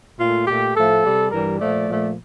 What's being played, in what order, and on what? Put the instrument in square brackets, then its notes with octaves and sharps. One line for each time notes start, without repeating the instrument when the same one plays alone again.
[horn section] A#2 A3 F4
A#2 A3 G4
A2 F3 A3 A4
C3 G3
G2 E3 G3 A#4
A#2 F3 A3 D5
A#2 F3 A3